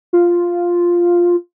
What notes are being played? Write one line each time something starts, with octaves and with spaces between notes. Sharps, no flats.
F4